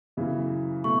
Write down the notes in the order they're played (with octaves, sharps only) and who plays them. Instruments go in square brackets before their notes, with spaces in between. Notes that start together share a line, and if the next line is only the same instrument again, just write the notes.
[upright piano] F#2 C#3 E3
[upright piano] B2 A3 [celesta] C#6